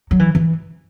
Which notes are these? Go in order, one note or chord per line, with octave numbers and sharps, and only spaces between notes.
F#3
E3
E3